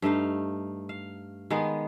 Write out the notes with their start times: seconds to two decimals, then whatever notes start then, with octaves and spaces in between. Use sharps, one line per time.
0.02 G2 A3 D#4 F5
0.89 F5
1.50 D#3 G#3 B3 G#4